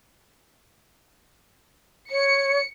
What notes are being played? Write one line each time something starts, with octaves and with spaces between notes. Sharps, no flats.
C#5 C#7